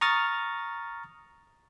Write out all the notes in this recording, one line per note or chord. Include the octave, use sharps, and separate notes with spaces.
A#5 C#6 D#6 F6 A6